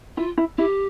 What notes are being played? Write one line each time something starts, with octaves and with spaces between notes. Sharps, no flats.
E4 F4
E4
E4 G4